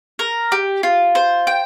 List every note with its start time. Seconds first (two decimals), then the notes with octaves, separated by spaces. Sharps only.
0.19 A#4
0.52 G4
0.83 F4
1.15 C5
1.47 G5